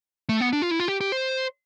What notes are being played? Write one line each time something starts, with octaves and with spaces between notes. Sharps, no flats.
A3
B3
D4
F4
E4
F4
G4
G4
C5